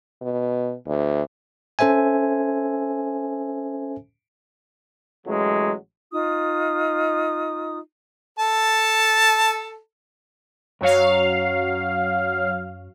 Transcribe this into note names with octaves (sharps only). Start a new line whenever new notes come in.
B2
D2
C#4 A4 C5 E5 G#5
A1 F#3 G#3
D#4 F4 D#6
A4 A5
F#2 F#3 C#5 F5